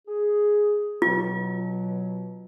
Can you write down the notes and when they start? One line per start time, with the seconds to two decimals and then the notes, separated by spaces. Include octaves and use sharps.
0.08 G#4
1.02 B2 F#3 F4